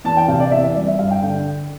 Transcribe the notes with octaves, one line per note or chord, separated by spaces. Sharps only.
E2 A5
G5
C3 F5
D5
E2 E5
E5
G3 D5
E5
G2 F5
G5
D3 G5